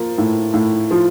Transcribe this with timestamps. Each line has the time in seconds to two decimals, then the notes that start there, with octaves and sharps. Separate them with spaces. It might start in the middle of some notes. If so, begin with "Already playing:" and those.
Already playing: F3 A#3
0.18 A2
0.54 A2
0.91 F3